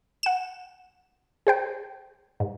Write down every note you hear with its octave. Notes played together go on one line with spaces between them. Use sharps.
F#5 E7
G#4 C5 G5
G#2